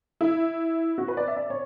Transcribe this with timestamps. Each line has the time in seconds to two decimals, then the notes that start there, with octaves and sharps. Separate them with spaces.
0.21 E4
0.98 F#4
1.08 B4
1.17 D5
1.28 E5
1.37 D5
1.50 C#5